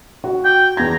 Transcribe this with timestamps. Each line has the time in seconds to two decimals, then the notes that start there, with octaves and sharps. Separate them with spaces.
0.24 F#4
0.45 G5
0.77 E2 A#5 G#6